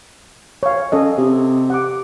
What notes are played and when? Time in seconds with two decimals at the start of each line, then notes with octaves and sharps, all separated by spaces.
0.63 C#5 F5
0.92 C#4 A4 D#5
1.18 C3
1.70 F#5 D6